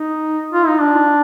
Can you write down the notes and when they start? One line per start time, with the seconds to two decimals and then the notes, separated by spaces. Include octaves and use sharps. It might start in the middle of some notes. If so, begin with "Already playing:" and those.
Already playing: D#4
0.52 F4
0.66 D#4
0.81 D4